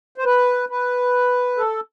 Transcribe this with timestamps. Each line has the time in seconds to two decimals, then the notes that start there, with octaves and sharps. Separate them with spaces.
0.18 C5
0.25 B4
0.69 B4
1.57 A4